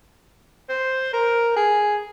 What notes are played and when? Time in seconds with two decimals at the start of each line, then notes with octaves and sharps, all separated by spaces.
0.69 C5
1.13 A#4
1.57 G#4